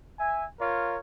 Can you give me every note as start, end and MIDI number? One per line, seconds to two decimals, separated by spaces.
0.19 0.46 76
0.19 0.46 80
0.60 0.97 65
0.60 0.97 70
0.60 0.97 73